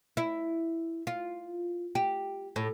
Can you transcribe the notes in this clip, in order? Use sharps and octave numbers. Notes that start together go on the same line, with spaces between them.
E4
F4
G4
A2